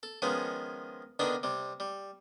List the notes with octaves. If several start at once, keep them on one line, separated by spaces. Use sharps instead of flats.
A4
D#3 F3 G#3 B3 C#4
D3 D#3 B3 D4 D#4
C3 G3
G3